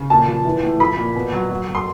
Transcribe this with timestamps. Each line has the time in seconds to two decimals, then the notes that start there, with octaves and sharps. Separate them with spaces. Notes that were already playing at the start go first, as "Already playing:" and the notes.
Already playing: C#3
0.10 A#2 A5
0.28 F3
0.45 E3
0.63 A2
0.80 F3 B5
0.97 A#2
1.15 B2
1.32 F#3
1.50 F#3
1.68 F#3
1.75 C6